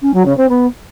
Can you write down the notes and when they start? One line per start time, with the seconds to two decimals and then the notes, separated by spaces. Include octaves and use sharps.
0.02 C#4
0.13 F#3
0.25 C#3
0.37 C4
0.49 B3